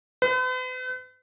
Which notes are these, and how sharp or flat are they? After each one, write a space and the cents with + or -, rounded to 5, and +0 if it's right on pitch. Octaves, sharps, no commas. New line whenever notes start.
B4 +45